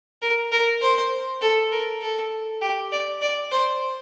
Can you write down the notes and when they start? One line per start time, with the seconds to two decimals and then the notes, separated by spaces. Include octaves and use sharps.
0.22 A#4
0.52 A#4
0.82 C5
1.42 A4
1.72 A#4
2.02 A4
2.61 G4
2.92 D5
3.22 D5
3.52 C5